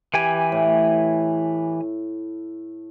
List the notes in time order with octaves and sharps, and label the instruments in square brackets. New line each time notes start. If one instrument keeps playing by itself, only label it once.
[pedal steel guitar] E3 G4 G#5
[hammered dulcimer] A2